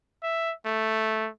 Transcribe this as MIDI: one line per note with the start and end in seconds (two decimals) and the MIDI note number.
0.23 0.53 76
0.66 1.29 57